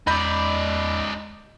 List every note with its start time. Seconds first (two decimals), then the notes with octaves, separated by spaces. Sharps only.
0.07 E2 G#3 D#4 D5 B5 G6